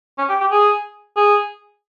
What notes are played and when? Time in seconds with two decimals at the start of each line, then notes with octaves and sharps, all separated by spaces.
0.18 C#4
0.29 G4
0.41 G4
0.51 G#4
1.17 G#4